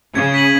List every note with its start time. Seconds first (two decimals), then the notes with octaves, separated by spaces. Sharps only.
0.15 C#3 G#6
0.34 B6 D#7 F#7